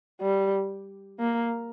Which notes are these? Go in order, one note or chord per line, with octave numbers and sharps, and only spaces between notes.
G3
A#3